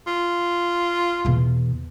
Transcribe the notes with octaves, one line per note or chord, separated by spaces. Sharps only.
F4
E2 B2